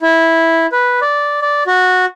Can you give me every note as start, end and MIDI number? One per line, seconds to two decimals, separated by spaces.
0.01 0.66 64
0.72 1.00 71
1.01 1.41 74
1.41 1.63 74
1.67 2.05 66